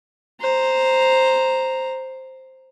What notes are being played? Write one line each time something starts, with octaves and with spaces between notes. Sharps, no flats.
C5 A#5